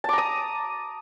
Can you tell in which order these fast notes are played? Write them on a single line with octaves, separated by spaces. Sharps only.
A5 D6 A#5 D#6